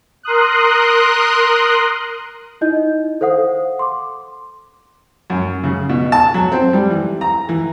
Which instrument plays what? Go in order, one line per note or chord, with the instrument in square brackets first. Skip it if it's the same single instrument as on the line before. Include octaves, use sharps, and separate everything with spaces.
[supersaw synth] A#4 C6 D#6 F#6
[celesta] D#4 E4 D#5 G6
A4 C5 F5 F#5 D#6
C6 D6
[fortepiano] F#2
C#3
B2
A5
F#3
C4
G3
E3
A#5
E3